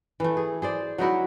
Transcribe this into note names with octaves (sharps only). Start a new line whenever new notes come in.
E3 A3
G#4
G#4 C5 D5
F#3 D#4 E4 F#4